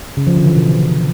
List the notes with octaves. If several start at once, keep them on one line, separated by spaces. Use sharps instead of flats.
C#3
F3
D3
E3
B2